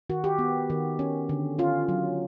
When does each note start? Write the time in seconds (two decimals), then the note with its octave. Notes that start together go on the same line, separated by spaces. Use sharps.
0.10 D#3 F#4
0.24 G4
0.39 B3
0.70 D#3
0.99 C#4
1.29 D3
1.59 C#4 F4
1.88 F#3